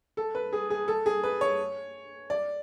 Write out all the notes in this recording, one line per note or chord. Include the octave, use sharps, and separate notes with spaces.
A4
B4
G#4
G#4
A4
G#4
B4
C#5
D5